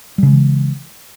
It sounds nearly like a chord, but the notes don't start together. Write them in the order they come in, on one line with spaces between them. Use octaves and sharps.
G3 C#3 G#3 E3